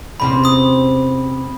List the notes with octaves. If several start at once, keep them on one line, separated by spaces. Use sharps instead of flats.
E2 C3 C#4 B5
B5 D#6